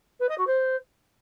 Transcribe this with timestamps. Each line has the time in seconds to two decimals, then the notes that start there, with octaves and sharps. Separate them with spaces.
0.20 B4
0.29 D#5
0.38 F#4
0.47 C5